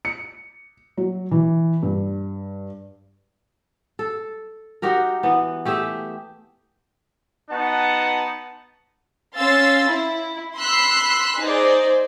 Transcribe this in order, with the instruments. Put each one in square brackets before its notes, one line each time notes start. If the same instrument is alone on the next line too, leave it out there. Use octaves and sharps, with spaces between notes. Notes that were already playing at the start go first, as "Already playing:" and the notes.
[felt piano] C#7
F#3
E3
G2
[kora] A4
D#4 F#4 G4 A#4
E3 B3
A3 G4 G#4 E5
[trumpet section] B3 D#4 F#4 F#5 A5
[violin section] C#4 F5 C6 E6 A6
E4
B5 C6 E6 F#6 B6 C7
D#4 G#4 C5 D5